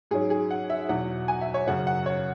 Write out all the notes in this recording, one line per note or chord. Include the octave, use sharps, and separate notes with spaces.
G#2 F#3 C#4 G#4
G#4
F#5
E5
E2 B2 F#3 F#5
G#5
E5
C#5
F#2 C#3 F#3 C#4 F#5
F#5
C#5